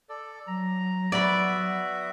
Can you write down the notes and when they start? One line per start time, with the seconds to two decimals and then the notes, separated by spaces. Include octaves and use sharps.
0.09 A4 D5
0.47 F#3 A#5
1.12 B3 F#4 D5 E5 B5